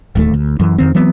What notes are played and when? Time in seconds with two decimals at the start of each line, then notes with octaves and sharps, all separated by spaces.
0.15 D1 D#2 A3
0.34 D2
0.60 F#2 E3
0.78 F2 D#3 C4
0.95 E3 F#3 B3 C4